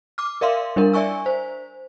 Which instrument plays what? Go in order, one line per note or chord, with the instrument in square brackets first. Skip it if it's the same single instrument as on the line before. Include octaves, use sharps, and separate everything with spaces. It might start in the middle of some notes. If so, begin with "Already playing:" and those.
[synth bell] D6 F6
A#4 D5 E5 F5 C6
G3 D4 E4 A#4
D5 E5 G#5 C#6 E6
C5